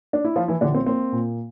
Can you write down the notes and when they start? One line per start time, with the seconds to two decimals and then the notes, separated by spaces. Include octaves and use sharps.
0.13 D4
0.25 E4
0.36 F3 F4
0.48 E3 E4
0.61 A#1 D3 D4
0.74 C4
0.86 A#3 C4
1.12 A#2